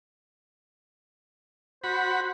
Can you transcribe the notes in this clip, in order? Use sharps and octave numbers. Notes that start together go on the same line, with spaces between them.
F#4 C5 B5